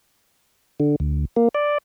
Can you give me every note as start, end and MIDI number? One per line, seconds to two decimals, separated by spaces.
0.80 0.96 50
1.00 1.25 38
1.36 1.48 58
1.55 1.78 74